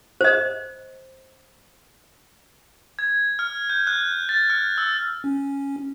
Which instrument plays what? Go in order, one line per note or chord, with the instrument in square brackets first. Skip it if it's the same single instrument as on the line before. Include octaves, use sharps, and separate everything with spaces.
[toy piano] C5 D#5
[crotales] G#6
F6
G6
F#6
A6
F6
E6
[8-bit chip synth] C#4